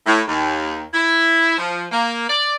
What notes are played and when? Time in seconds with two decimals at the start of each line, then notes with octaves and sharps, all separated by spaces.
0.07 A2
0.28 D#2
0.94 E4
1.58 F3
1.92 A#3
2.29 D5